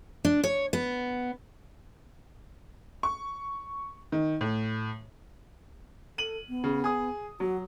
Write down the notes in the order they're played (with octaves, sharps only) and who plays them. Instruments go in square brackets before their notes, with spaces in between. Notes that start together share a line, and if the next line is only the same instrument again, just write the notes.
[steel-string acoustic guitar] D4
C#5
B3
[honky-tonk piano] C#6
D#3
A2
[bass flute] A4 [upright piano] D#7 F#7
[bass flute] B3
[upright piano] C#3
G#4 D#6
[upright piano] F#3 [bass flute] F#4